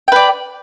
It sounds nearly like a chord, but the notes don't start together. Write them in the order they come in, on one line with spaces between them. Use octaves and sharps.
G5 B4 D5